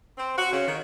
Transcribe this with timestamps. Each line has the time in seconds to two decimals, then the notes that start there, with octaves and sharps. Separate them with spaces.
0.18 C4
0.37 F#4
0.51 C#3
0.66 D#3